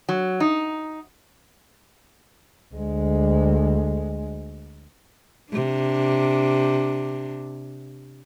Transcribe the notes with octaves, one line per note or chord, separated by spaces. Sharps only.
F#3
D#4
D2 G#3
C3 D4